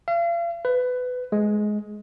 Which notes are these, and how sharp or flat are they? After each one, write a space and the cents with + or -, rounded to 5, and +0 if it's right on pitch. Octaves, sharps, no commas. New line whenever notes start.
F5 -40
B4 +20
G#3 +15